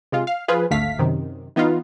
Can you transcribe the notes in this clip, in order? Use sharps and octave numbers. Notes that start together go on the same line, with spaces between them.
C3 G#3 F4
F5
F3 F4 G#4 B4
G#1 D2 D3 A3 F5 B6
F#2 C3 D#3
E3 B3 D#4 F4